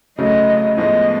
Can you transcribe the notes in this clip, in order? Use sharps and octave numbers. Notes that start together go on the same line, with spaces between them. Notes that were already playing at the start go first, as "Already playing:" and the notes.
C#3 F#3 A3 D#5
A2 F3 G#3 B3 D#5